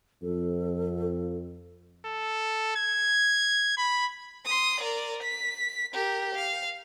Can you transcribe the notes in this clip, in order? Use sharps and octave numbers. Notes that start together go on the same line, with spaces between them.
F2 A4
A4
G#6
B5
C6 D#6
A#4 D5
B6
G4 A#4
F5